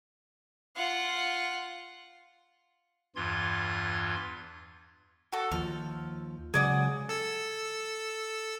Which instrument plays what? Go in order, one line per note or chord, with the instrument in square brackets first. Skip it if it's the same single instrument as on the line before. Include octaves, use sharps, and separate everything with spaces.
[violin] F4 F#5
[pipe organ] E2 G2 E3 F4 C6 G#6
[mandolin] F#4 A4
[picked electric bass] D#2 F3 [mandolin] F6
[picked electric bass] C#3 F#3 G#3 [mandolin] G#4 D5 F#5
[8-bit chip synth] A4 E6